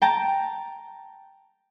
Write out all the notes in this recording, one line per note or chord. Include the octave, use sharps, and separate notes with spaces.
G5 A5 A#5